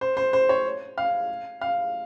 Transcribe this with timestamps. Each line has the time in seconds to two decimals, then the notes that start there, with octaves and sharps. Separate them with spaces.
0.01 C5
0.17 C5
0.33 C5
0.49 C#5
0.98 F5
1.61 F5